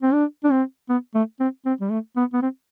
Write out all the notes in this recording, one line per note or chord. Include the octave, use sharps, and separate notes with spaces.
C4
D4
D4
C4
B3
A3
C4
C4
G3
A3
B3
B3
C4